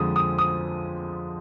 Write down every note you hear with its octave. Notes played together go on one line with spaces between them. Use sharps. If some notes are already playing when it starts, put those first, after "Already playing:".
Already playing: F2 D3 F3 G#3 D#6
D#6
D#6